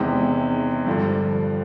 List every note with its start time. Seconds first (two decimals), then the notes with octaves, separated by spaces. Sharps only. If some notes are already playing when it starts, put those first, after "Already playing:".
Already playing: E2 C3 D#3 G#3
0.87 G2 D3 F3